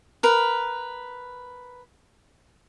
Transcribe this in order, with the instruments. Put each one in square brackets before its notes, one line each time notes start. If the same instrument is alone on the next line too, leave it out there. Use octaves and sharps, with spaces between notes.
[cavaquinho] A#4 B4